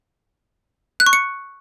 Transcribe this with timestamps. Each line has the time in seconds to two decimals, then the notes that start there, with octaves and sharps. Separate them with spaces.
1.00 F#6
1.06 C#6
1.13 C#7